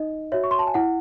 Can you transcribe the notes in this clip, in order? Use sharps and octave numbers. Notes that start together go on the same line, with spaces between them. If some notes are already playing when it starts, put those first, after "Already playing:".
Already playing: D#4 D#5
F#4 C#5 E5
C#6
C6
A5
G#5
E4 F#5